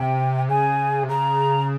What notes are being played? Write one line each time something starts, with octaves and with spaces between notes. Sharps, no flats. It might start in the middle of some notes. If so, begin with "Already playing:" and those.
Already playing: C3 G5
C#3 G#5
C3
C#3 A#5